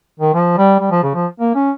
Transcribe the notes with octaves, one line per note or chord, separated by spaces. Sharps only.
D#3
F3
G3
G3
F3
C#3
F3
A#3
C#4